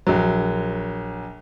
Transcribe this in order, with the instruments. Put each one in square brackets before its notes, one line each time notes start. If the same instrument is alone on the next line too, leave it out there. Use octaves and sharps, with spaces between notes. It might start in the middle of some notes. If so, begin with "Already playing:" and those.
[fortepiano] A#1 F#3